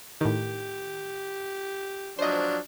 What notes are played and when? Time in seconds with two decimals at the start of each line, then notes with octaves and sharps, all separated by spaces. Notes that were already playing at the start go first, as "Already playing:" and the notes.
0.21 A2 D#3 G4
2.19 F3 F#3 D4 C5 D#5